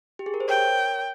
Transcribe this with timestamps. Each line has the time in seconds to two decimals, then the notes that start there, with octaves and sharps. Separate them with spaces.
0.19 G4
0.26 G#4
0.34 A#4
0.40 C5
0.48 A#4 C#5 G5